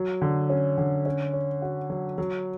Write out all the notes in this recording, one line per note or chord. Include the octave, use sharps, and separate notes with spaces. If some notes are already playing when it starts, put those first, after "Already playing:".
Already playing: F#3
D3
C#4
D3
C#4
C#5
F#4
F#3
F#3